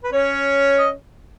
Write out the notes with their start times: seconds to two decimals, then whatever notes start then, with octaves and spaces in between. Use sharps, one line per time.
0.04 B4
0.12 C#4 C#5
0.78 D#5